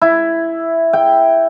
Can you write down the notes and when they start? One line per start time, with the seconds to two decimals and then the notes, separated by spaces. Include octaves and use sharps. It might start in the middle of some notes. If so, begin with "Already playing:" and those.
0.02 E4
0.93 G5